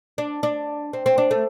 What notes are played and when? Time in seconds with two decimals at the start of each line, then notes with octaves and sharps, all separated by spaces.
0.18 D4
0.43 D4
0.93 C4
1.06 C4
1.18 D4
1.31 A3